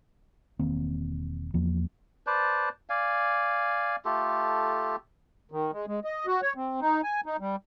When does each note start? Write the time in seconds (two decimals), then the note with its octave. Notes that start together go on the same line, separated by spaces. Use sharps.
0.59 E1 D#3 A#3 C4
1.54 E2 F3 A#3
2.27 B4 C5 D5 A5
2.89 D5 F5 G#5
4.05 A3 F4 G4 A4
5.52 D#3
5.72 G#3
5.87 G#3
6.04 D#5
6.27 F#4
6.42 C#5
6.56 C4
6.81 D#4
7.03 G#5
7.26 D#4
7.40 G3